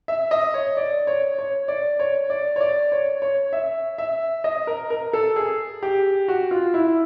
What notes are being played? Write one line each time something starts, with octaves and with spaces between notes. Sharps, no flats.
E5
D#5
C#5
D5
C#5
C#5
D5
C#5
D5
C#5
D5
C#5
C#5
E5
E5
D#5
A#4
A#4
A4
G#4
G4
F#4
F4
E4